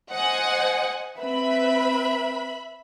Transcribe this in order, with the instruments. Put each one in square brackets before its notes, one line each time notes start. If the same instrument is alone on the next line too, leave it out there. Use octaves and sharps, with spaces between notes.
[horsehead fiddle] C5 D#5 [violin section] F#5 G#5
[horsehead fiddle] C4 B4 [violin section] E5 B5